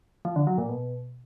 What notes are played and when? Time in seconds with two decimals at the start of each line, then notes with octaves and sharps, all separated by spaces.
0.25 F3
0.36 D3
0.47 F#3
0.58 A#2
0.69 B2